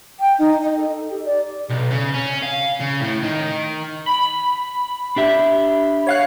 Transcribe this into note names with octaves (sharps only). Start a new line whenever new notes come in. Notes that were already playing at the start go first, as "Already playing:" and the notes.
G5
D#4
D#5
A4
G4
D5
B1
C#3
C#4
F5
C#3
A2
D#3
B5
D4 G4 E5
C#5 F5 F#6